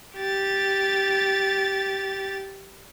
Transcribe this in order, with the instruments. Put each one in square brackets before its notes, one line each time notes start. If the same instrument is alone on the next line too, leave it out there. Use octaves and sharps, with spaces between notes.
[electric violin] G4 A6